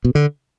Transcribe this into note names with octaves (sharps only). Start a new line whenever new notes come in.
B2
D3